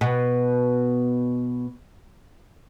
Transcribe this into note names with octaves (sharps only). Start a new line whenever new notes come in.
B2 B3